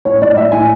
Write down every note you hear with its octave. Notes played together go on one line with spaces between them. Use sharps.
A2 C#5
A2 D5
A2 E5
A2 G#5